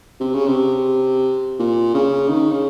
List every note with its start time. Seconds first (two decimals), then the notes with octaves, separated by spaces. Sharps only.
0.20 C3
0.34 C#3
0.47 C3
1.59 A#2
1.94 C#3
2.29 D#3
2.52 C#3